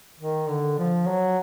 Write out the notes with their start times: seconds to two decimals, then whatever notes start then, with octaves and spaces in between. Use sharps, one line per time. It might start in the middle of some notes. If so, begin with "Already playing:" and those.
0.20 D#3
0.50 D3
0.79 F3
1.07 F#3